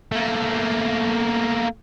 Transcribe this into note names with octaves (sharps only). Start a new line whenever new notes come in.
A3 A#3